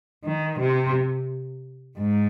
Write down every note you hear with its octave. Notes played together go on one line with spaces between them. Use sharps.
D#3
C3
G#2